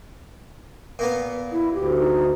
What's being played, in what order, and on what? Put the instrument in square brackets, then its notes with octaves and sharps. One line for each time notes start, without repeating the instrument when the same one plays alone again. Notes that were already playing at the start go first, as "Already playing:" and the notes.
[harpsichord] A#2 A#3 B3
[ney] E4
[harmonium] D2 [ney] G4
[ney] D#4